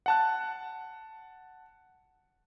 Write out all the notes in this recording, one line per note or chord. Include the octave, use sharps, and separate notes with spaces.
F#5 A5 F#6